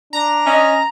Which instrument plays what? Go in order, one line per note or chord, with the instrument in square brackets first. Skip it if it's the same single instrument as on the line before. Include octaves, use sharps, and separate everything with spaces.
[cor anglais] D4 [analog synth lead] A#5
[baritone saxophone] C#4 [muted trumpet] D#5